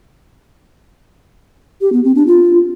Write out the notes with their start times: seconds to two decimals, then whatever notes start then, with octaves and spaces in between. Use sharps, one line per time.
1.81 G4
1.93 B3
2.04 C4
2.15 D4
2.27 F4